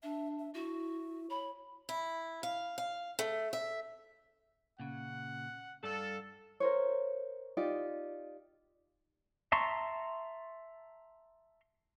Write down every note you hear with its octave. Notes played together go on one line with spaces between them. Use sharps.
D4 E5
E5
E4 F#4
C#5 B5
E4
F5
F5
A3
E5
A#2 C#3 F#5
G2 A4 D5 F5
A#4 C5 C#5
D#4 F4 G4 D5
E5 A5 A#5 C6 C#6